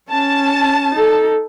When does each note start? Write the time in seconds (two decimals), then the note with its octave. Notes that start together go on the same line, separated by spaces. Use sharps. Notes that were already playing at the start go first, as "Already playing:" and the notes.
0.11 C#4 A5
0.95 D#4 A4